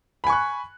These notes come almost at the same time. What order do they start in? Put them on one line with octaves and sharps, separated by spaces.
B5 G#5 C#6 F#6